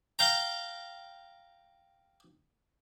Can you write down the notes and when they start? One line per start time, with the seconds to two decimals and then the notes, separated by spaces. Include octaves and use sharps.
0.19 F5 G5 A#5